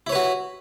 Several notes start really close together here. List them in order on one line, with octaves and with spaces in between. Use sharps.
E4 C#5 B4 F#4